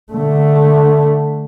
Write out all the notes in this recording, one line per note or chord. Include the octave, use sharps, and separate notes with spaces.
D3 A3